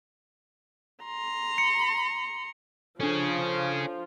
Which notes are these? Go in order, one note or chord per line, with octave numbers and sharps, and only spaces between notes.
A#5 C6
C#7
F3 C#4 D4 F4 G#4 A4